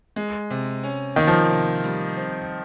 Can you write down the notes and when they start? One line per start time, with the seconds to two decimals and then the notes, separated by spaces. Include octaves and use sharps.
0.16 G#3
0.50 C3
0.83 C#4
1.16 D#3 A#3
1.27 F3
1.50 C3
1.84 G3
2.17 C4